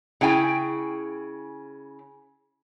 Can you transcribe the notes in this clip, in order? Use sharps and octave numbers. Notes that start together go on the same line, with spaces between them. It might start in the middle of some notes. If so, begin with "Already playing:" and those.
C#3 E4 G5 G#5